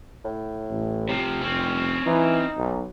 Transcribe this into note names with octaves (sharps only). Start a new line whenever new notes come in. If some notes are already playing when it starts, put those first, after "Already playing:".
A2
A1
C3 F3 G4
F1 C4 C#4
E3 D#4
B1